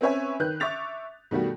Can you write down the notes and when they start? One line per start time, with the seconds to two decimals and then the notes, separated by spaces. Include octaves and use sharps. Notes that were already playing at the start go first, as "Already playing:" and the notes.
0.01 C4 C#4 B4 C#5 E5 G#5
0.40 D#3 B4 F#6 G6
0.60 E5 C#6 D6 A6 F7
1.31 B2 D#3 G3 A3 F#4